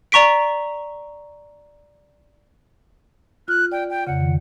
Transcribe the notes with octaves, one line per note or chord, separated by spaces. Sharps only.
D5 A#5 C#6 B6 D7
F4 F6 F#6
D5 G5
G5
F2 C#3 F#5
D#3